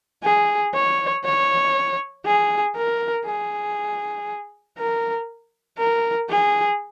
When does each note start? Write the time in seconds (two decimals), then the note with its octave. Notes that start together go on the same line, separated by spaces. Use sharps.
0.24 G#4
0.74 C#5
1.25 C#5
2.25 G#4
2.76 A#4
3.26 G#4
4.78 A#4
5.78 A#4
6.29 G#4